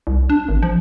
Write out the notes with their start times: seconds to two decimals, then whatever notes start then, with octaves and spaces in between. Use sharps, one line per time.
0.07 C2
0.30 D4
0.49 G#1
0.62 F3